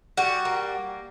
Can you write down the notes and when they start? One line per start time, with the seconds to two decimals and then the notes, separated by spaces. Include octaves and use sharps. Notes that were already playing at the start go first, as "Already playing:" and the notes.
0.17 G3 F#4
0.45 A#3